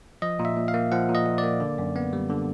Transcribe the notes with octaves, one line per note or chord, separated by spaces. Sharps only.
F3 D#5
A#2
E5
A#2
F5
A#3
F3 F#5
A#2
D#5
A#2
D5
A#3
D3
F#2
B3
G3
D3